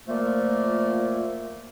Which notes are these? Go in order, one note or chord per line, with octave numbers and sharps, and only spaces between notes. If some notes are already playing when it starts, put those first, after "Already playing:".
A#2 F3 A3 A#3